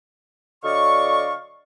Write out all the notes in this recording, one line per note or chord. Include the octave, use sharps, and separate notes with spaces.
D3 F#3 D5 D#5 F5 C#6